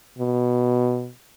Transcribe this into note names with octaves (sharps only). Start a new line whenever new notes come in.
B2